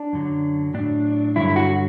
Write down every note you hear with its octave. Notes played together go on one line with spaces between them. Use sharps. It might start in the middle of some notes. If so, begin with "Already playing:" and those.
Already playing: D4
F#2 D3 F#3
A2 F#3 D4
G2 D3 F#3 E4
F#4